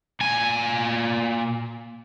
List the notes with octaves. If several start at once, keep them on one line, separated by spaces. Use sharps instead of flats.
A#2 G#5